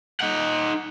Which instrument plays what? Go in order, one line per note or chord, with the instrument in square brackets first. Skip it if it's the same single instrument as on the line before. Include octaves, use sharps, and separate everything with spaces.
[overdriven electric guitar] D#4 F#5